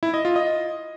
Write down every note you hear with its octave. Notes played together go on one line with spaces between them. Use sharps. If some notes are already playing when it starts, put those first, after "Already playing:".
E4
D#5
F4
D#5